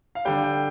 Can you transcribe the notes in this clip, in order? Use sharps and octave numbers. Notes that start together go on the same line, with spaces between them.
F5
D3 G3 G5
G5